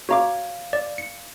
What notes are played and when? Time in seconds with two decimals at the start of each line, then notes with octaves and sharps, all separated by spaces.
0.09 F#4 C#5 F5 A#5 D6
0.73 D5
0.98 C#7